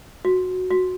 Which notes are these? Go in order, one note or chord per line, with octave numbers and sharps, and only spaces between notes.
F#4
F#4